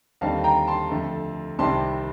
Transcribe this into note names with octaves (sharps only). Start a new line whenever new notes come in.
D#2 D3 G3 C4 F5 A5
G5 A#5
A5 C6
F2 D3 A3
C2 C3 D#3 G3 C4 A5 C6